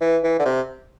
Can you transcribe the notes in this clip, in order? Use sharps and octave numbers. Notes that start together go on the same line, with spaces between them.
E3
E3
D3
C3